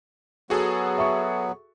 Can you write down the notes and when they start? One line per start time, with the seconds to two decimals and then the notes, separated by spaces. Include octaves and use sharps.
0.50 F#3 B3 F#4 G#4 A4
0.98 E5 C#6